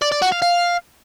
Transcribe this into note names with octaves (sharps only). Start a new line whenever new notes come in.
D5
D5
F#4
F5
F5